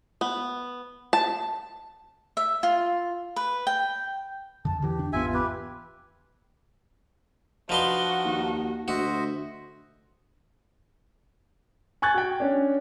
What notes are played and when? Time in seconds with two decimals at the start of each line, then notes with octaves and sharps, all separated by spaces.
0.21 B3
1.13 A5
2.37 E5
2.63 F4
3.36 B4
3.67 G5
4.65 F2 D3 A5
4.82 E2 D3 E3 G4
4.99 D4
5.13 G#1 E2 B3 F4 E5 G#5
5.34 G4 B4
7.69 F3 D4 D#4 F#4 B4 D#5 C6
8.25 D#2
8.88 D2 F#4 C5 D#5 E5
12.02 G#5 C#6 F#6 G#6 A6
12.14 F#4 G5
12.40 C#4 D4